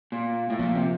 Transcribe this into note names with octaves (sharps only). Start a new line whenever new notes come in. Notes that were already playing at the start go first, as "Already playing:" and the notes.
A#2
A2
A#2 F3 A#3 F4
C3